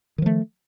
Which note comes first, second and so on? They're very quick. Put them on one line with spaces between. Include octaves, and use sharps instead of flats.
D#3 F3 A3